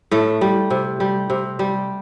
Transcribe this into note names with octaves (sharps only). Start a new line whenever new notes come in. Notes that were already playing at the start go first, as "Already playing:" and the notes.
A2 A3
G3
C3
G3
C3
G3